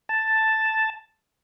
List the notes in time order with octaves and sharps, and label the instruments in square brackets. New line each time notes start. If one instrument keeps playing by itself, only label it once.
[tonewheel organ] A5